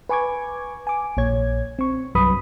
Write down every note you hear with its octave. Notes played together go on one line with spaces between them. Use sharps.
B4 G#5 C#6 D6 G#6
G#5 D6
A#1 A#2 C#5 G#6
C4 C#6
C2 G2 F#3 B4 B5 D#6